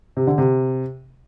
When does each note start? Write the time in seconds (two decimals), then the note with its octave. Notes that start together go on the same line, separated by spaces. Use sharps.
0.17 C3
0.27 D3
0.38 C3